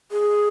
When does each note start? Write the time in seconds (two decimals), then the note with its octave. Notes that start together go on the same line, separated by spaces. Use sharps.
0.12 G#4